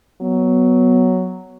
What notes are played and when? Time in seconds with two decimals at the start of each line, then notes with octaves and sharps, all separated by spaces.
0.22 F#3 B3